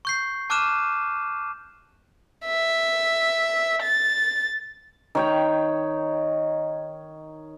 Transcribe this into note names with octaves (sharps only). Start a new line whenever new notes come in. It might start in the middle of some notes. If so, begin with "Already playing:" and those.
C#6 G6 C7
A5 D6 F6 F#6 D#7 E7
E5
A6
D#3 C#5 G5